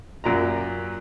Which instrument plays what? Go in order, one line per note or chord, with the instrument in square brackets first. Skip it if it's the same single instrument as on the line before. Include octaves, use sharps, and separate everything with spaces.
[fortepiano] F#2 A#2 A#5